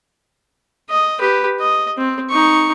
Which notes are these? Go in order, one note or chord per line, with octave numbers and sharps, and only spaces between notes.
D#5
G4 B4
D#5
C4
D#4 C#6